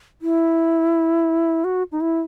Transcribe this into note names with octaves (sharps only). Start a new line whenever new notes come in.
E4
F#4
D#4
E4